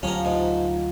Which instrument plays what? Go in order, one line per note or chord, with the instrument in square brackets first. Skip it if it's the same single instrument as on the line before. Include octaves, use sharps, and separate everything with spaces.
[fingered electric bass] D2 F#3 [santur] F3 G4 A#5 [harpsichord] C#4 A#4
[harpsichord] G#2